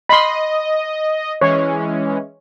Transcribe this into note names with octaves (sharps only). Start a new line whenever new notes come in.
D#5 B5 C6
E3 G#3 C#4 C#5